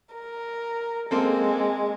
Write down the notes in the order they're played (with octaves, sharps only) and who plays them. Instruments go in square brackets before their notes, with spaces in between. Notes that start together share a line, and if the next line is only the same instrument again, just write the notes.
[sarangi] A#4
[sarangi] G#3 [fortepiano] A#3 C4 A4